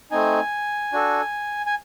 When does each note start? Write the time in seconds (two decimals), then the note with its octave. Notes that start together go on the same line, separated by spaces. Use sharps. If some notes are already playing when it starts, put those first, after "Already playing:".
0.11 A3 C4 D#4 G#5
0.93 D4 F#4 A4
1.66 G#5